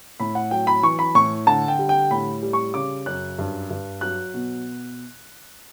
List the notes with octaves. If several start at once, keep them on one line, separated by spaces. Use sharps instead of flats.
A2 B5
F#5
F#3 G5
B5
E3 C#6
B5
A2 C#6
D3 A5
G5
G3
G5
A2 B5
G3
C#6
C#3 D6
F#2 F#6
G2
G2
F#3 F#6
B2